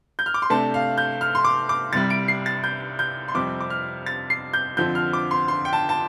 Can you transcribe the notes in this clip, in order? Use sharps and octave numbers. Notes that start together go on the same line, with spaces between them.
G6
F6
D6
C6
C3 A3 D4 A5
F5
G6
F6
C6
D6
D6
C2 C3 G3 A6
D7
C7
A6
G6
G6
C6
F2 C3 G3 C4 D6
D6
F6
A6
C7
G6
F2 D3 F3 C4 G6
F6
D6
C6
C6
G5
A5
A5